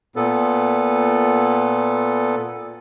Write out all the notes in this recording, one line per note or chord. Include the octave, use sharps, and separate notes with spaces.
A#2 B3 A4